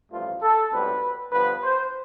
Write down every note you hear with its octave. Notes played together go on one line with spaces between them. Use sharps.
A1 G2 F3 A3 F4
A4
B1 A2 G3 C4 B4
G2 D3 F3 B3 B4
C5